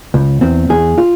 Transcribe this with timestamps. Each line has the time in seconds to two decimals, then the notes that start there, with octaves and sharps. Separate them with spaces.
0.14 C#2
0.41 E2 C4
0.69 E2 G#4
0.98 F4